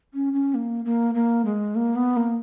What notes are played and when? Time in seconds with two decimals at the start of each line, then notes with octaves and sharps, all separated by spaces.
0.14 C#4
0.33 C#4
0.54 A#3
0.85 A#3
1.15 A#3
1.45 G#3
1.76 A#3
1.96 B3
2.17 A#3